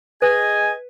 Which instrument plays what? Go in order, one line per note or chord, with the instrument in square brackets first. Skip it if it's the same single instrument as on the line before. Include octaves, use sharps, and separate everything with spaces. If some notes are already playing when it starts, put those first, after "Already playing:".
[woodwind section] G#4 D#5 G#5 [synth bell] B4